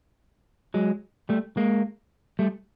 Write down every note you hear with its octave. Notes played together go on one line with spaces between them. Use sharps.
F#3 G#3
G3 A3
G#3 A#3
G3 A3